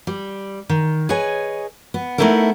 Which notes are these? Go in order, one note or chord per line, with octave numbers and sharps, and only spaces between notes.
G3
D#3
G#4 B4 C#5 D#5 G#5
B3
A3 B3 D#4 E4 A4 A#4